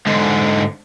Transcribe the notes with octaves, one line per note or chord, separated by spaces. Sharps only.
G#2 D3